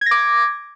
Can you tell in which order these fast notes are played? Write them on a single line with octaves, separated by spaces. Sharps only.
G#6 A#6 D6